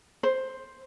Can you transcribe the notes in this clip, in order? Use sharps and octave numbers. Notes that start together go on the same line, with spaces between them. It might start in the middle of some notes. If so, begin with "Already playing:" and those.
C5